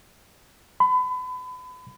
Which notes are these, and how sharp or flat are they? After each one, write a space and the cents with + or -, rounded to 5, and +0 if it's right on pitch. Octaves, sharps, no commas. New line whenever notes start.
B5 +35